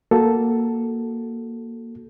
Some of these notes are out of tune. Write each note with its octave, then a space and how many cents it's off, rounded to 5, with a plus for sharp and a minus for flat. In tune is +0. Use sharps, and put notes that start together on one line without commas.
A#3 +0 F#4 +0 A4 +0